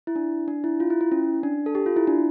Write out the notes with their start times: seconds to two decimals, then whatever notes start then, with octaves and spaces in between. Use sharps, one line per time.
0.07 E4
0.16 D4
0.48 D4
0.64 E4
0.80 F4
0.90 E4
1.01 E4
1.12 C#4
1.43 D4
1.66 A4
1.75 G4
1.86 F4
1.96 E4
2.07 D4